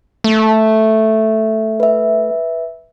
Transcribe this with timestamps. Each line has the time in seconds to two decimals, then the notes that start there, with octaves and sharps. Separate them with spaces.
0.24 A3
1.80 B4 E5